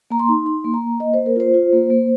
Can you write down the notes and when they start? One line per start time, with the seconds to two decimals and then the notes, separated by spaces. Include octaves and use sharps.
0.11 A#3 A#5
0.19 C6
0.29 D#4
0.46 D#4 C6
0.64 A#3
0.74 A#5
0.82 A#3
1.00 A#3 D#5
1.14 A#3 C5
1.26 A#4
1.36 F4 C5
1.54 F4
1.73 A#3
1.90 A#3